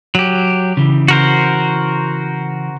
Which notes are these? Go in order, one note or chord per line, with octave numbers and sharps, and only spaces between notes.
F#3 G4
C#3 E3
F#4 A#4 C5